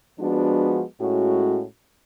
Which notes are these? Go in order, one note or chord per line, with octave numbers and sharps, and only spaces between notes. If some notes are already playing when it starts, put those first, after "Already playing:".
F3 G#3 B3 D4 F#4
A2 G#3 C#4 F#4